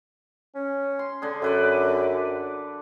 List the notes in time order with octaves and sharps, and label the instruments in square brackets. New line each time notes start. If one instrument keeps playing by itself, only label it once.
[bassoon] C#4
[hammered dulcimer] C6
D3 D4 G#4
[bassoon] F#2 [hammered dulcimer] A4 B4 D5